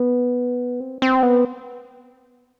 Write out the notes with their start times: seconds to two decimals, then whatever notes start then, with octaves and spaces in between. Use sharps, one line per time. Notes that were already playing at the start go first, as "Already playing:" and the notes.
Already playing: B3
0.80 C4
1.02 C4
1.23 B3